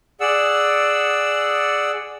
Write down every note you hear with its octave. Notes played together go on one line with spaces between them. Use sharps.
G#4 D5 F#5 E6